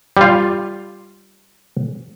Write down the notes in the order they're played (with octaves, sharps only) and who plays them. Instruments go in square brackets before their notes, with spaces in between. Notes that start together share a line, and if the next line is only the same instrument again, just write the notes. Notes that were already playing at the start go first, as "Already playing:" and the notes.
[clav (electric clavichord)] G3 F4